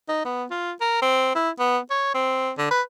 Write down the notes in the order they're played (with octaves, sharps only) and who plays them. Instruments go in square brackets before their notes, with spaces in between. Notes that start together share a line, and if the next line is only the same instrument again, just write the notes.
[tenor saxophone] D#4
B3
F4
A#4
C4
E4
B3
C#5
C4
D3
B4